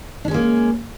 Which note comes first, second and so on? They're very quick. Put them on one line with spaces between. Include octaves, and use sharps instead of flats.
D4 C#4 G#3 A#3